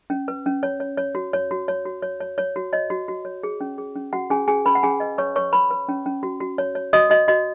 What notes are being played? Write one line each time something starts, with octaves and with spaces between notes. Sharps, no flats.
C#4
B4
C#4
C#5
C#5
C#5
F#4
C#5
F#4
C#5
F#4
C#5
C#5
C#5
F#4
C#5 D#5
F#4
F#4
C#5
G#4
C#4
G#4
C#4
C#4 F#4 F#5
C#4 G#4 G#5
C#4 G#4 G#5
C#4 B4 B5
F#5
C#4 G#4 G#5
B4 D#5
B4 C#5 C#6
B4 C#5 C#6
B4 B5
B4
C#4
C#4
F#4
F#4
C#5
C#5
F#4 D#5 D#6
F#4 D#5
F#4 D#5